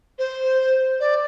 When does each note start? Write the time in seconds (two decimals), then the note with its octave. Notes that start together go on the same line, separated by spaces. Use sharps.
0.19 C5
1.00 D5